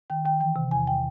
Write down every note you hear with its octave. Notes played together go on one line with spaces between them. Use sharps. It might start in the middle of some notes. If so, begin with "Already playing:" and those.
D#3 G5
D#3 G5
E3 G5
C3
E2 G#5
G5